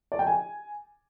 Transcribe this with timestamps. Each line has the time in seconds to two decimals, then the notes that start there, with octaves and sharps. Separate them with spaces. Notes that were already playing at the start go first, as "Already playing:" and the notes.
0.12 D5
0.19 G5
0.27 G#5